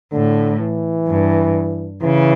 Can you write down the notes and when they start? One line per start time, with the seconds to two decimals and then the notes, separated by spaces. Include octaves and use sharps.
0.12 A2 D3
0.60 E3
1.08 G2
2.02 C#3 E3